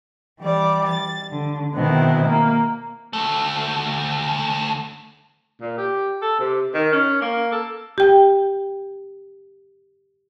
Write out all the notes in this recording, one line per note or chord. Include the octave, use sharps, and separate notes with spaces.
E3 G3 D5
A6
D3
B2 D#3 B3 C4 E4
A#3
D2 A3
A#2
G4
A4
C3
D#3
C#4
A#3
A4
G4 G5